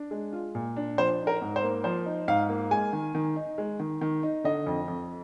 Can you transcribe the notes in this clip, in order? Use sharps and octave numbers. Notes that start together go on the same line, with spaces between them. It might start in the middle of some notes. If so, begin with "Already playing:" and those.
Already playing: D4
G#3
F4
A#2
D4
F3 C5
D#4
A#4
G#2
C5
A#3
F3 C5
D#4
G#2 F5
A#3
G#3 G#5
D#3
D#3
D#4
G#3
D#3
D#3
D#4
D3 D#5
F2
F2